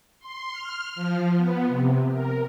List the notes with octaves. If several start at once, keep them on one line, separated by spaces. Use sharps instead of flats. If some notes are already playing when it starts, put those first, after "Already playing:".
C6
F6
F3
B3
C3
A#4